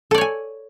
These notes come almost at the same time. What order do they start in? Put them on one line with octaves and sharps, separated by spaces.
A4 D5 C#5 G#5